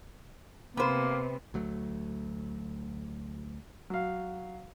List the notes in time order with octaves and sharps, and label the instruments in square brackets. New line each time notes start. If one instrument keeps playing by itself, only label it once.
[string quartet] C3 [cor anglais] A#3 [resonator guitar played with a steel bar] B3 C5
[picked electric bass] D2 F#3 A3
[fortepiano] F#3 F5